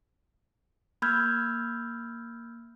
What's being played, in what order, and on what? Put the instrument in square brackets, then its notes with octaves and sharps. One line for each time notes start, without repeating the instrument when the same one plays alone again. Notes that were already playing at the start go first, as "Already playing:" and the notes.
[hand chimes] A#3 B5 E6 F6 G6 G#6